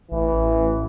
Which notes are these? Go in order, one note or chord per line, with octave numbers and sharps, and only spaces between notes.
A1 E3